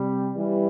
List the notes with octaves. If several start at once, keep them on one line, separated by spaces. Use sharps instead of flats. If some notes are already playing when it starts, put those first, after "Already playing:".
Already playing: C3 G3
E3 G3